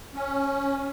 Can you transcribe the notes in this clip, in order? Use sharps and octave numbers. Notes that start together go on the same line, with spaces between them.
C#4